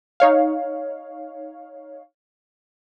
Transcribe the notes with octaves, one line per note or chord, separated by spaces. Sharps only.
D#4 C#5 F5